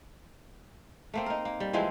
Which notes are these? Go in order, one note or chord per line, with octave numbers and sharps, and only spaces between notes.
A3 A#3 C4
D#4 A#4
A#3
G3
E3 F3 G#3 C4